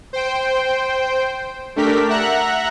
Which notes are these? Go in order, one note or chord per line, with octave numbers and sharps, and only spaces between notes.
C5 G5
A3 D4 G4 A#4 B6
E5 F#5 A#5 F#6